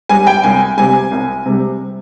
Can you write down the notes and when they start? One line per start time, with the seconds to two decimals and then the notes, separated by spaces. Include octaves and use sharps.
0.09 G3 G#5
0.27 G5
0.43 C2 G#5
0.77 C3 G3 G#5
1.11 C2
1.46 C3 G3